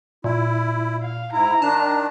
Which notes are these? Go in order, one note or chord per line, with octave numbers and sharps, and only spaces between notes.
A#2 E4
F5
G#2 E4 A#5
D#3 D4 A5